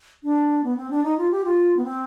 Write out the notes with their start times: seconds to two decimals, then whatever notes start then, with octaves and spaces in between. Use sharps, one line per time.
0.23 D4
0.64 B3
0.77 C4
0.90 D4
1.04 D#4
1.18 F4
1.31 G4
1.45 F4
1.77 B3
1.84 C4